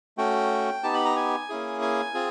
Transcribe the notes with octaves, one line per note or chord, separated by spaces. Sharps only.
A3 C#4 F#4 G5
B3 D#4 G4 A5
B5
A#5
G#5
A#3 C#4 E4 G#4
G#5
C4 F4 G#4